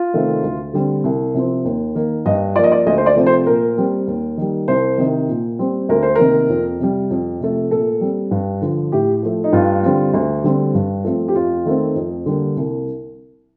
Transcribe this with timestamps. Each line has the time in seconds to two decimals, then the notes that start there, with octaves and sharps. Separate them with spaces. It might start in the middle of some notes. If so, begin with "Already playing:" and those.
Already playing: F4
0.13 C3 D#3 A3 C4
0.44 D2
0.74 D3 G3 C4
1.04 C2
1.34 C3 F3 C4
1.65 D#2
1.95 D#3 A#3
2.26 G2 D#5
2.56 F3 A#3 D5
2.64 D#5
2.72 D5
2.86 D2 D#5
2.98 C5
3.06 D5
3.16 C3 F3 A3 C4
3.26 C5
3.46 A#2 A#4
3.77 G3 C4
4.07 D#2
4.37 D#3 G3
4.68 C2 C5
4.98 C3 D#3
5.29 A#2
5.59 G3 C4
5.89 D2 A#4
6.02 C5
6.15 C3 D#3 A#3 A#4
6.49 F2
6.80 C3 G3
7.10 F2
7.41 C3 F3 A3
7.71 A#2 A4
8.01 G3 C4
8.31 G2
8.62 D3 F3
8.92 A2 G4
9.23 F3 A3
9.44 D#4
9.53 G2 F4
9.83 D3 G3 C4
10.14 D2
10.44 D3 G3 C4
10.74 G2
11.04 F3 A3 C4
11.28 G4
11.35 F2 F4
11.65 D#3 A3 C4
11.96 F2
12.26 D3 G3 A#3
12.56 C2